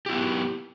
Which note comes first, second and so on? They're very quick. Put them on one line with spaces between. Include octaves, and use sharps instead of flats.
G4 E4 B3